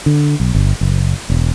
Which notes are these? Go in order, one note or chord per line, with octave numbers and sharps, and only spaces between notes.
D3
B1
G1
F#1
E1